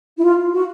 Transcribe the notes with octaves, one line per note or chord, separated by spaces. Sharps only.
E4
F4
F#4